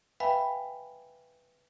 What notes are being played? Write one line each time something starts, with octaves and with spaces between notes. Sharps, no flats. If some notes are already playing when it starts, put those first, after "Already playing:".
B4 E5 F5 G5 G#5 B5